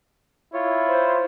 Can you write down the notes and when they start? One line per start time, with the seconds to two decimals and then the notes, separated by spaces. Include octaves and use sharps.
0.53 E4 F4 C#5
0.88 C5